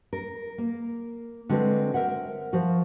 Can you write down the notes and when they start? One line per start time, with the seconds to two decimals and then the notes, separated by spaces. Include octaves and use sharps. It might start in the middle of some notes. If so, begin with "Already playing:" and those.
0.13 A#4
0.58 A#3
1.49 D3 G#3 C4 F#4 B4
1.94 A#4 C5 E5 F#5
2.53 F3 F#4